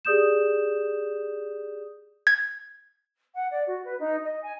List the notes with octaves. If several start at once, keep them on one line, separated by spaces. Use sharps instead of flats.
G4 G#4 D5 D#6 G6 E7
G#6
F#5
D5
F#4
B4
D#4
D#5
G#5